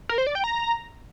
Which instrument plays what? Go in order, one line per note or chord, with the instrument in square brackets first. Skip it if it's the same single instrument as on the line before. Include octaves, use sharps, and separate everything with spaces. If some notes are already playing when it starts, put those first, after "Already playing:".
[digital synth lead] A#4
C5
D5
G5
A#5